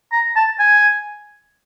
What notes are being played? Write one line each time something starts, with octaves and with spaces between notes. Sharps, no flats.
A#5
A5
G#5